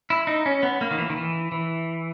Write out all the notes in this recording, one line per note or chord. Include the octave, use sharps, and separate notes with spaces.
E4
D#4
C#4
B3
A#3
D#3
E3
D#3
E3
E3